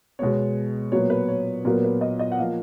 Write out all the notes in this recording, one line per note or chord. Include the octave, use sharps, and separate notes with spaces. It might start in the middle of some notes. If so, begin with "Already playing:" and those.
B2 G#3 B3 C#5
A#2 F#3 B3 C#5
B4
C#5
A#2 F#3 B3 A#4
B4
D#5
D#5
F#5
F3 A#3 F5